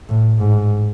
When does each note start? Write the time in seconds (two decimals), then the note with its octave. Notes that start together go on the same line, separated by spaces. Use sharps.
0.09 A2
0.39 G#2